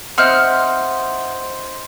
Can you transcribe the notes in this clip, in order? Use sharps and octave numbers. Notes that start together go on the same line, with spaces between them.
C4 D#4 C5 E5 F#5 C6 F6 G6